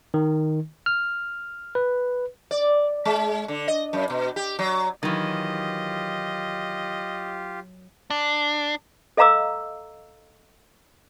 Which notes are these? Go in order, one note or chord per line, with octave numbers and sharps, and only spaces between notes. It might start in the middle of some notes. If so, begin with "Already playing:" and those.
D#3
F6
B4
D5
G#3
D3
D#5
F#2
B2
G4
F#3
D#3 E3 F#3 F4 G4 D#5
D4
A4 D#5 F5 A#5 D6 E6